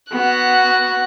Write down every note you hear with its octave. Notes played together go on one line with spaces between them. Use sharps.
B3 F#4 F#6